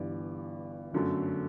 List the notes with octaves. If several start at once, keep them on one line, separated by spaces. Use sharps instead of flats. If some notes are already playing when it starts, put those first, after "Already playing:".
Already playing: G1 G2 E3 D5
G1 F#2 D3 F#3 A3